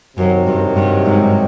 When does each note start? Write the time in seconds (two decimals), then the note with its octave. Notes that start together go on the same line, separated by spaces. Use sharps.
0.17 F#2 C3 D#3 F#3
0.47 G2
0.77 G2
1.06 G#2